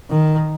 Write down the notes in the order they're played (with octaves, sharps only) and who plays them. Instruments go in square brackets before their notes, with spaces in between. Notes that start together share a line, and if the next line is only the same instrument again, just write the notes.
[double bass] D#3